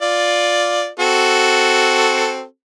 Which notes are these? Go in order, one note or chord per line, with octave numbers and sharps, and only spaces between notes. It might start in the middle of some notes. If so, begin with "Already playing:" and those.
F4 D5
C4 F#4 A4